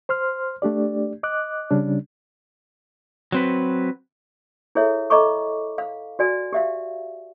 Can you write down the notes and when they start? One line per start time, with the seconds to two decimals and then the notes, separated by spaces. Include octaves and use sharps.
0.09 C5 C6 F6
0.62 A3 D4 G4 D5
1.23 D#5 D6 F#6
1.71 C#3 G3 C#4 D4
3.32 F#3 C4 B4
4.75 E4 G#4 A4 C#5 E5
5.10 A4 D#5 A#5 B5 C#6 D6
5.78 F5
6.19 F#4 D5 G#5
6.53 G4 E5 F5